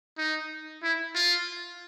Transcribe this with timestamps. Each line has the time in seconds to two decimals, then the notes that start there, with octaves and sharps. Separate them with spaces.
0.18 D#4
0.83 E4
1.15 F4